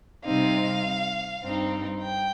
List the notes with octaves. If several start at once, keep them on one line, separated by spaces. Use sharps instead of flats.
C3 G3 C4 D#4 F5
G2 G3 C4 D#4
G5